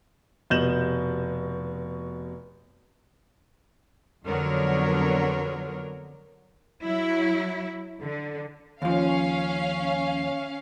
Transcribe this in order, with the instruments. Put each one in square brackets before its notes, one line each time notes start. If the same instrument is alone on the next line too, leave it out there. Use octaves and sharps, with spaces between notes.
[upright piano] F1 B2 D#5 G6 E7 F#7
[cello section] F2 D3 F#3 B3 A#4 C#5
F#3 E4
D3
[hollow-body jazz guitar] D#2 F3 [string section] C#4 F5